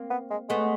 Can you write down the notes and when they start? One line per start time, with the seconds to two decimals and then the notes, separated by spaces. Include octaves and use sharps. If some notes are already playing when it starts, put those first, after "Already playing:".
Already playing: A#3 C4
0.10 B3
0.30 G#3
0.49 G#3 A3 B3